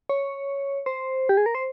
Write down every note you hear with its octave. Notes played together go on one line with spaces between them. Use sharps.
C#5
C5
G4
G#4
A#4
C5